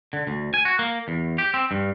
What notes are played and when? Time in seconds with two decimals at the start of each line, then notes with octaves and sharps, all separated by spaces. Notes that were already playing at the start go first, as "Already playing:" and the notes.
0.13 D3
0.27 D2
0.54 G#5
0.65 F#4
0.79 A#3
1.08 E2
1.38 G4
1.54 C4
1.71 G2